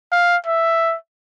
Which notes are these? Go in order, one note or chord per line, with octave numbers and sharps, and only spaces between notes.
F5
E5